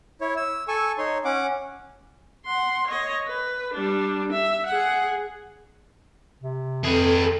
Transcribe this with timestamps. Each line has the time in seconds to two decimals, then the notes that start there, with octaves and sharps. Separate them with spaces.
0.21 E4 C#5
0.37 E6
0.68 A4 G#5 C#6 E6
0.98 D#4 C#5 C6
1.25 C#4 F#5 D6
2.45 F#5 C6
2.88 C#5 D#5
3.27 B4
3.74 G3 D4
4.33 E5
4.67 G#4 F#5
6.43 C3
6.85 F2 G#4 A4 B4